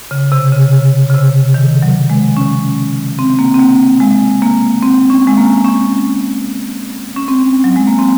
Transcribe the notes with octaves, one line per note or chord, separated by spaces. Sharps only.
C#3
C3
C#3
C#3
C#3
C3
D#3
F#3
G#3
C#4
C4
A#3
C4
A#3
G#3
A#3
C4
C#4
G#3
A#3
C#4
C#4
C4
F#3
G#3
A#3
C4